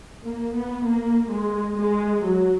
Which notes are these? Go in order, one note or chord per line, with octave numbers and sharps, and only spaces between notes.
A#3
B3
A#3
G#3
G#3
F#3